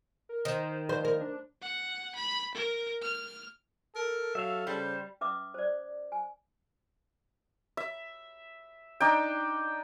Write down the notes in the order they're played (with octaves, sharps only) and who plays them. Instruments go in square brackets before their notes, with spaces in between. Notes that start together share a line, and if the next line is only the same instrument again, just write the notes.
[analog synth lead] A#4
[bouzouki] D#3 [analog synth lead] C5
[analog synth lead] F3 [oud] C5
[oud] A#4
[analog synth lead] D4
[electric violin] F#5
B5
A#4
F6
[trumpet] A4 [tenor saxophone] A#4
[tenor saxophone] F#3 [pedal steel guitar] E5 F5
[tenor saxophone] C#3 [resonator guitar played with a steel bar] G3 [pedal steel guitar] G4 C5
[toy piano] C#4 B4 E5 D6 D#6
C5 D5
G#5
[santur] E5
D4 D#4 G5